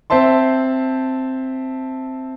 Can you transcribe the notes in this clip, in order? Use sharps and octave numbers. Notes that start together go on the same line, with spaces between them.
C4 C5 E5 A5 C6